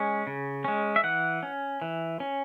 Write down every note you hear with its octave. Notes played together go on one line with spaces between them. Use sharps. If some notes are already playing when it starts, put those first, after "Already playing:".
Already playing: G#3 C#4
C#3
G#3 C#4
E5
E3 F#5
C#4
E3
C#4